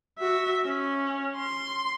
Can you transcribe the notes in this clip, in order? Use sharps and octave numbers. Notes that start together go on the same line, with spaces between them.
F#4 E5
C#4
C6